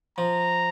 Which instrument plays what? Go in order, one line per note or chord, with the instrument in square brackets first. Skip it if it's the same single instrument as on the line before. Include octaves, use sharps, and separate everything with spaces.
[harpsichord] F3 [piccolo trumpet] A#5